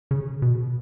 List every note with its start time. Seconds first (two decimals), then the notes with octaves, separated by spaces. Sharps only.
0.11 C#3
0.42 B2